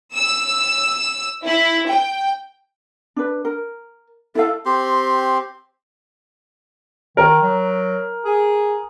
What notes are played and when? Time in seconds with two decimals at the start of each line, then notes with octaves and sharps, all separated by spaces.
0.16 E6
1.45 E4
1.89 G5
3.16 D4 B4
3.45 A#4
4.35 E4 A4 F5
4.66 C4 G4 C6
7.17 D#3 A#4
7.42 F#3
8.25 G#4